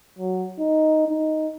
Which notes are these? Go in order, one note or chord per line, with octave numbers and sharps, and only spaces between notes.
F#3
D#4
D#4